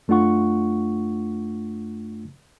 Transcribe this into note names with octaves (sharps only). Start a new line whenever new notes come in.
F#2 A3 D4 F4 F#5 C#6